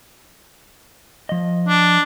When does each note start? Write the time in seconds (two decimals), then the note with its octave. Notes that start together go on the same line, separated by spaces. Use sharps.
1.29 F3 D#5
1.69 D4